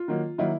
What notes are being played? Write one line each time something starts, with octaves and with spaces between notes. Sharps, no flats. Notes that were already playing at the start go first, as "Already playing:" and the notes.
Already playing: F4
D#3 F#3 A#3
D#3 F#3 A#3 E4